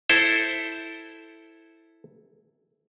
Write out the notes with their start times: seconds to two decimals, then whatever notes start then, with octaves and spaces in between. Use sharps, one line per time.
0.09 E4 A4 C5